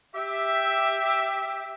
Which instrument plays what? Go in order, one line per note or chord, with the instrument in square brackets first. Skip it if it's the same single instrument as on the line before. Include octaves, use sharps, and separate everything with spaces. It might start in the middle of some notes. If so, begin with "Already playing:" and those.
[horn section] G4 E5